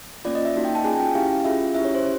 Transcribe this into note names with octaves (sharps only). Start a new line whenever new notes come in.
A#3 C#4 F4 D5
D#5
E5
A#3 D#4 F#4
G5
A5
C#4 F4 G#4 G#5
G5
C#4 E4 G4 F5
C#4 F4 G#4 E5
C#4 E4 G4 E5
C#5
C5